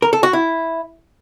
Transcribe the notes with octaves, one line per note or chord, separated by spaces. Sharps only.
A#4
A4
F#4
E4